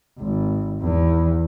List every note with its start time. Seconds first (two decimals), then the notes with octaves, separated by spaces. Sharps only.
0.18 G#1
0.80 E2